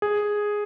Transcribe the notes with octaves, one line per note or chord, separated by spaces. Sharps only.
G#4